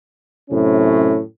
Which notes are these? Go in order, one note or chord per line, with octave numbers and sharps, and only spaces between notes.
F#2 A2 C3 C#4